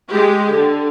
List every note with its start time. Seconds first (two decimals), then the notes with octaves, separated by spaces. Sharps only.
0.11 G#3 G4
0.53 D3